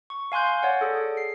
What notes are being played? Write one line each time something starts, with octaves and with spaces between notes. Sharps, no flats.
C#6
F5 G#5 C6 F#6 G6
C#5 D5 F#5
G#4 A4
C7